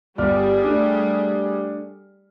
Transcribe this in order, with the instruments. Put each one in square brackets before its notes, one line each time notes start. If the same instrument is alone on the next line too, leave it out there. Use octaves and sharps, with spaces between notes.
[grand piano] G1 D5 F6 [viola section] G3 G#4
[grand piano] A3 D4